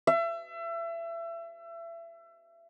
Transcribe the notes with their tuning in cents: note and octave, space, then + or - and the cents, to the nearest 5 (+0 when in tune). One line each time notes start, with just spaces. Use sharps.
E5 +30